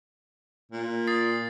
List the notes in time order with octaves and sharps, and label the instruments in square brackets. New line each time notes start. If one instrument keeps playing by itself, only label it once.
[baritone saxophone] A#2
[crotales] D#6 A6 C7